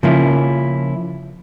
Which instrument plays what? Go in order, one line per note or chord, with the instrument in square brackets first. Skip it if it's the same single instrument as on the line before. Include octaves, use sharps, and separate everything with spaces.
[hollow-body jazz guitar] C#3 F3 A#3 C#4 E4